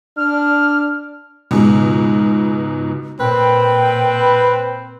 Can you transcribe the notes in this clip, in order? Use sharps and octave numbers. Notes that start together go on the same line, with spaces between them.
D4 F6
C#2 G#2 B2
A#2 C4 B4 G5